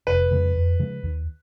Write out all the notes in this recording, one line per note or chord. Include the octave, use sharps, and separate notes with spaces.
F1 B4
F2 C#3 G#3
F2
C#3 F3 G#3
D#2